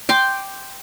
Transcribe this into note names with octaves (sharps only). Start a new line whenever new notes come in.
G5 C6 D6